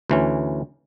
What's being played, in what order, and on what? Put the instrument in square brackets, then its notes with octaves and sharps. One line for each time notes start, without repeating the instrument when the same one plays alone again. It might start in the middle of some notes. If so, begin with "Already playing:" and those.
[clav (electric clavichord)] D2 E3 C#4